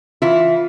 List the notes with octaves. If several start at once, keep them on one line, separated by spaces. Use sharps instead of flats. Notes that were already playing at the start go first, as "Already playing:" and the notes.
E3 E4 F4